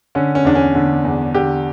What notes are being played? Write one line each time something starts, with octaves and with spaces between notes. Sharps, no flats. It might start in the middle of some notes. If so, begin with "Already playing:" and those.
D3 C#4
C#4
E2 D4
C#4
D3
E2
D3 G4